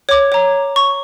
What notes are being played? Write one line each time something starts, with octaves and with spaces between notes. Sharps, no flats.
C#5 D6
C#5 A#5
C#6